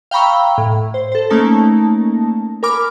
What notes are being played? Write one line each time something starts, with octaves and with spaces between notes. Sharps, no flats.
F5 G5 A#5 B5 C#6 E6
A2
C5
A4 C5
A3 A#3 C#4 D#4 A5 A#6
A#4 G#5 B5 D6 F6